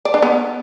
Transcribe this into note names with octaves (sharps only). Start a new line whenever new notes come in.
D5
D4
B3